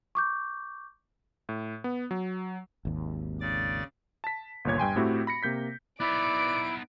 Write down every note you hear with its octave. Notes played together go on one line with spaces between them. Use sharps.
C#6 D6 G6
A2
B3
F#3
G#1 D#2
C#3 D5 A6
A5 B6
G1 D#2 A#2 C#5 G#6
G2 G5 G#5 C6
A2 A3 C4 E4 F#4 G4
B5 A#6 C#7
C3 A#3 G6 B6
B3 D#4 E4 D5 D7